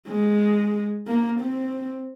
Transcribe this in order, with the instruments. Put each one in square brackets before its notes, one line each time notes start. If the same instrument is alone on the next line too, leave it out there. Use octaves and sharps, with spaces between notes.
[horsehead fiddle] G#3
A#3
C4